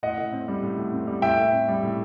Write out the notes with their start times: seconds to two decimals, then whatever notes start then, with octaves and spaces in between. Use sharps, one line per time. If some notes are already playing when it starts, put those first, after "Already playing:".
0.03 A2 D#5 F#5
0.17 A2
0.33 C4
0.48 G3
0.63 A2
0.78 A2
0.93 C4
1.07 G3
1.22 A2 E5 G5
1.38 A2
1.53 C4
1.68 G3
1.83 A2